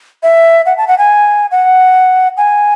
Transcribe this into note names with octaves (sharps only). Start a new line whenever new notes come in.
E5
F#5
A5
F#5
G#5
F#5
G#5